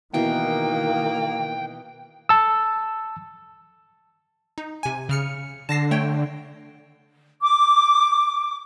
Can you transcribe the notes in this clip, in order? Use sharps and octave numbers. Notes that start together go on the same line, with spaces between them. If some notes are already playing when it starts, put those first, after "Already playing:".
B2 D#3 E3 A#3 G5
A5 E6
D#4
C3 G#5
C#3 F6 C#7
D3 A5 A#6 C7
A3 C#5 G5
D6